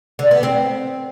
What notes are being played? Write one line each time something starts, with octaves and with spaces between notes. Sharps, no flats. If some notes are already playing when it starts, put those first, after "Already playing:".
D3
B3
C4